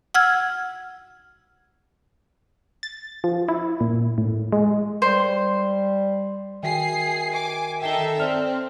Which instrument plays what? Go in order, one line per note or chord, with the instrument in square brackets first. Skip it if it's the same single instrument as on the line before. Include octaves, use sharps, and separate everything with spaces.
[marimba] F#5 E6 F6 G#6
[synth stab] A6
F3
E4
A#2
A2
G#3
[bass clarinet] G3 [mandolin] C5
[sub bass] D#3 [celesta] F#4 E5 G5 [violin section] G#4 C7
[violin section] G#5 D6
[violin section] D#4 A4 E5 [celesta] G5 C7 G7
[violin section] C4 [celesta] D5 F6 F7